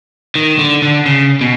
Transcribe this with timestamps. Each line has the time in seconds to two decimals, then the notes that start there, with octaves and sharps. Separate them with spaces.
0.35 D#3
0.59 D3
0.82 D3
1.06 C#3
1.41 B2